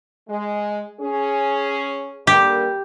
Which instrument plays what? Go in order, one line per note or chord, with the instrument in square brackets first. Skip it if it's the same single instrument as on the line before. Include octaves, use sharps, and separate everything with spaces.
[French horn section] G#3
C#4 G#4
[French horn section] D3 G3 A#3 [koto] G4